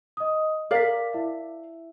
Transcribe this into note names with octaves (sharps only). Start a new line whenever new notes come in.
D#5 D#6
A#4 D5 F5 D6 B6
E4 E5